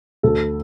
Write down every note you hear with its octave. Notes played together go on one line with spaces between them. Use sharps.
D2 A4